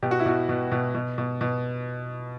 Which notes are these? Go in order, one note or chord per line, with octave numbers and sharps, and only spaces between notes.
B2 G4
F#4
E4
B2 F#4
B2
B2
B2
B2
B2